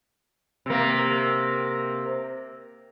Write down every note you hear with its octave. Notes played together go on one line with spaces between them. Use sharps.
C3 A#3